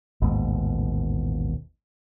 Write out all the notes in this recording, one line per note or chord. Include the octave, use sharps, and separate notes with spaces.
A1 D#2 G#2 B2